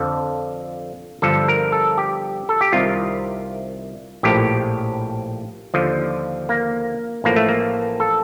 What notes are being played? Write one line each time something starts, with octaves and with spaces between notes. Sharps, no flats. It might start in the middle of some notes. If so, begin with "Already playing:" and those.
Already playing: F2 D3 F3 A4
G1 G2 D3 F3 A4
A#4
A4
G4
A4
G4
C2 C3 D#3 F4
A#1 A2 F3 G4
D#2 D3 F3
A#3
A1 A2 F3 A#3
A3
A#3
A4